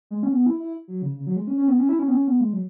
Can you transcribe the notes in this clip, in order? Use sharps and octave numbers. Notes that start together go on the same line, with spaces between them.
G#3
C#4
B3
E4
E4
F#3
C#3
C#3
F#3
G#3
C#4
C#4
B3
C#4
E4
C#4
B3
C#4
B3
G#3
F#3